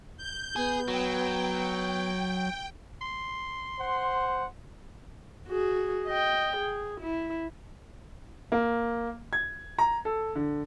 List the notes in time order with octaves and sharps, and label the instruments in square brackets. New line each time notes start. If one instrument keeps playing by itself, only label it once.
[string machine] G6
[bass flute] B3 [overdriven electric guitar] G#4
[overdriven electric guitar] F#3 [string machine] G5
[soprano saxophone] C6
[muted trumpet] C5 [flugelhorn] F#5
[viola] F#4 G#4
D#5 G5
G#4
E4
[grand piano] A#3
G#6
A#5
A4
D3